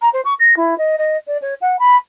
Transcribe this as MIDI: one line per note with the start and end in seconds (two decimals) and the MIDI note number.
0.01 0.09 82
0.13 0.21 72
0.25 0.34 85
0.39 0.54 94
0.56 0.77 64
0.78 0.96 75
0.98 1.17 75
1.27 1.37 74
1.42 1.54 73
1.61 1.79 78
1.79 1.96 83